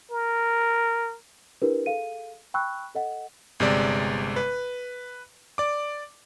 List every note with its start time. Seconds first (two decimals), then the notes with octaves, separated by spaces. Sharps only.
0.11 A#4
1.62 D4 E4 G4 A#4 B4
1.86 G#4 A4 F5 D#7
2.54 G5 B5 C#6 E6 F#6
2.95 A4 D#5 F#5
3.60 G1 C3 G#3 D5
4.36 B4
5.58 D5 D6